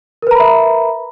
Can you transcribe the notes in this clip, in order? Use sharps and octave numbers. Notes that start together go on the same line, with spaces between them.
A#4 B4 E5 A#5 B5